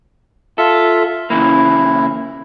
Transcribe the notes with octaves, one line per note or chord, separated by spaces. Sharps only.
F4 A4 E5
C#3 E3 A#3 E4